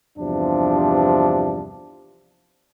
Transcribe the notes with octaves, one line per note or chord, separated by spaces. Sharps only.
E2 G2 C3 F3 D4